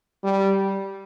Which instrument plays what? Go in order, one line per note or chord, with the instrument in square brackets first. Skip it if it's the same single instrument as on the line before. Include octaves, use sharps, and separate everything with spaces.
[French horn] G3